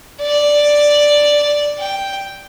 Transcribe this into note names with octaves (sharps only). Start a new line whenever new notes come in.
D5
G5